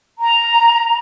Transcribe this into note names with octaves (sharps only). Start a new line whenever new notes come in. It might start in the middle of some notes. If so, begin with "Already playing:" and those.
A#5